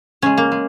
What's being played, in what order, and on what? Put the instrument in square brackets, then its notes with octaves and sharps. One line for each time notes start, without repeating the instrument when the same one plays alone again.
[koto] C#3 G#3 C#4
A#3
G#3